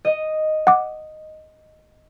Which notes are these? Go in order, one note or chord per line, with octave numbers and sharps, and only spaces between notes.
D#5
F#5 D6